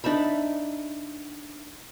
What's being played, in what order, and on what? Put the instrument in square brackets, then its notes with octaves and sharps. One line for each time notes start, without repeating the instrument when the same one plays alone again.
[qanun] D4 D#4 E5 B5